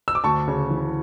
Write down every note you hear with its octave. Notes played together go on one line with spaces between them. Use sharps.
E6
D6
D2 A5 C#6
C#3
E3